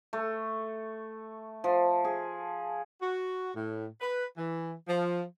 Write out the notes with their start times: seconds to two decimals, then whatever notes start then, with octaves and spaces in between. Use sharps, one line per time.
0.13 A3
1.64 F3
2.04 G#4
3.02 F#4
3.55 A2
4.01 B4
4.37 E3
4.88 F3